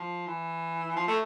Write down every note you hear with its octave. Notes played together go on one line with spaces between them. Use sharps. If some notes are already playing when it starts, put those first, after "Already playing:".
Already playing: F3
E3
F3
A3